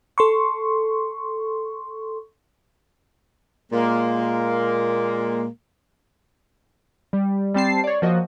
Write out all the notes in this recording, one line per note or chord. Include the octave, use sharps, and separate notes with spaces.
A4 C6 C#6
A#2 G#3 A#3
G3
G3 C4 A5 C7
C#5 D5
F3 A#3 F#4 D#5